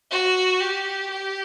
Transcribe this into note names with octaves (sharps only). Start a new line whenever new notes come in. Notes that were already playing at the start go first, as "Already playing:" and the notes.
F#4
G4
G4